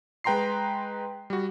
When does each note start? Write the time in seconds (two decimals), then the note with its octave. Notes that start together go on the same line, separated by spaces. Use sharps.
0.24 G#3 B4 G5 A#5 C6 C7
1.30 G3 F#4